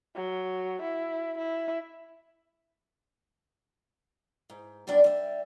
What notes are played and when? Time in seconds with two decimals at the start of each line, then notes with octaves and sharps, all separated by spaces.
0.15 F#3
0.82 E4
1.38 E4
4.50 G#2
4.87 F#2 B2 G3 D4 D5
5.04 G3 E5